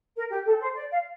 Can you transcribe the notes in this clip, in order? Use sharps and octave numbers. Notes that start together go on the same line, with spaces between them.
A#4
G4
A4
C5
D5
F5